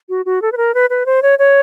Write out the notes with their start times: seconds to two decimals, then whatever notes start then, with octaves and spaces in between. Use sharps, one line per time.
0.09 F#4
0.26 F#4
0.42 A4
0.52 B4
0.57 A#4
0.74 B4
0.90 B4
1.06 C5
1.22 C#5
1.39 C#5